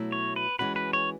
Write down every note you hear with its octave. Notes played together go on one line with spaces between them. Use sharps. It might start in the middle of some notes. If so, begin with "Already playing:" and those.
Already playing: B2 F#3 A3 E4
C#5
B4
E3 G#3 C#4 F#4 B4
B4
C#5